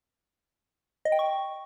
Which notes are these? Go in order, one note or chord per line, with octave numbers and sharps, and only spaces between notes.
D#5
G5
C#6